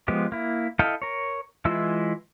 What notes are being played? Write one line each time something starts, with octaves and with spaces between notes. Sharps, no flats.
F3 G#3 B3 G4
A#3 E4
E4 A4 D#5 F5 G5
A#4 C#5
E3 G#3 E4 F4 E6